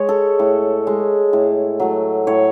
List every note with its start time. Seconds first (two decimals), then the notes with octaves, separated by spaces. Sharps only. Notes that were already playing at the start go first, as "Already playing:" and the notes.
Already playing: G#3 C#5
0.09 A4
0.39 A2
0.87 G#3
1.33 A2
1.80 F#3 A3
2.27 A2 C#5